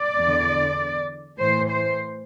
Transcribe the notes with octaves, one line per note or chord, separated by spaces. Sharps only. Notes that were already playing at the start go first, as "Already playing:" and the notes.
Already playing: D5
E2 D3
A2 E3 C5
C5